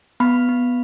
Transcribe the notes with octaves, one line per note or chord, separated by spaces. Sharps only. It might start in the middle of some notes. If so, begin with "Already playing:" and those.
B3 B5
B3